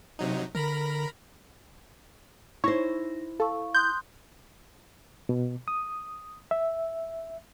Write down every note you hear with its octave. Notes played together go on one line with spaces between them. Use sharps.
C3 F#3 D#4
D3 A#4 A#5 B5
D#4 E4 C5 C#5 A#6
A4 F5 C#6
C6 D#6 F#6 G6
B2
D#6
E5